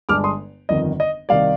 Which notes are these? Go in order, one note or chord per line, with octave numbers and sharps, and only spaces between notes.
G1 G2 D3 G#3 D4 D6 F6
C6 D#6
G1 F2 D#3 D#5
D#5
C2 C3 D#3 D5 F5